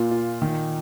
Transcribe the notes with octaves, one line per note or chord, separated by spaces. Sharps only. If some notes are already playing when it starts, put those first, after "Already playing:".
Already playing: A#2 F4
F4
D#3